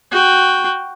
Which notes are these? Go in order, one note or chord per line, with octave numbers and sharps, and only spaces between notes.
F#4 G5